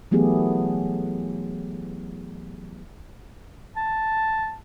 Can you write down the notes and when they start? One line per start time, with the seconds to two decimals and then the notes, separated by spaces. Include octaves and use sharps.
0.11 E3 F#3 A3 B3 G4 G#4
3.77 A5